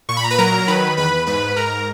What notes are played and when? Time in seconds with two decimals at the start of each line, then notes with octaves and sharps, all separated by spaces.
0.09 A#2 C#6
0.17 B5
0.24 A#5
0.30 B4 B5
0.38 F#3 A#4 A#5
0.68 D#3 B4 B5
0.97 E2 B4 B5
1.27 G#2 B4 B5
1.56 G#2 A#4 A#5